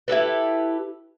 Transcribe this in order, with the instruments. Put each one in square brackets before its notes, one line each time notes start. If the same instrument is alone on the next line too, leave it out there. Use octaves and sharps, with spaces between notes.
[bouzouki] E4 G4 A4 B4